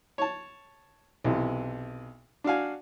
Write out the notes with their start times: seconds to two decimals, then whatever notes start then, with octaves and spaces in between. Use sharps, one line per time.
0.18 C#5 A5
1.24 B1 C3 E3
2.44 D4 F#4 F5 G#5